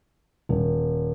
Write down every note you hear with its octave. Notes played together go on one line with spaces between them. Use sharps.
D#1